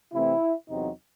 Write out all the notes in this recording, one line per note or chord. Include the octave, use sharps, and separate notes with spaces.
C3 E3 A3 C4 E4
E2 C3 F#3 C4 D#4